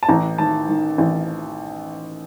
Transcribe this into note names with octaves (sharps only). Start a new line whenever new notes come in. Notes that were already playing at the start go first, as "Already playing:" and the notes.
A5
A1 A#5
D#3 A5
D#3
A1